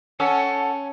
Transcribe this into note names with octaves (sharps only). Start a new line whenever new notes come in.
C#4 A4 F#5